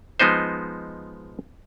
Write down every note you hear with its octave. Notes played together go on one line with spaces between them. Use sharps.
F3 G#3 B3 D#4 C5